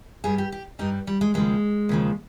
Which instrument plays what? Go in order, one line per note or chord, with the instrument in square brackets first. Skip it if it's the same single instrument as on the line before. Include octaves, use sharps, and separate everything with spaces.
[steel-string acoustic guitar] G2 G3 G#4
G4
G4
G2 G3 D#4
G3
G#3
D#2 C#3 F3 G#3
D#2 C#3 F3